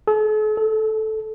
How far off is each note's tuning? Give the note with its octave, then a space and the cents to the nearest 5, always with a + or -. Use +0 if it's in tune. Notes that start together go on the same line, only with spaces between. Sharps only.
A4 -45
A4 -10